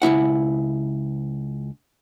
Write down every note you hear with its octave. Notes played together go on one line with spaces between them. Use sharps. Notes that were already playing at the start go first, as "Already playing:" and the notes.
C#2 E3 E4 F#5